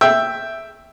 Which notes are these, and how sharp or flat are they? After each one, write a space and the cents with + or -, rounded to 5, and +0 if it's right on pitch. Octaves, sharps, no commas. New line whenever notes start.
E5 +0 G5 +0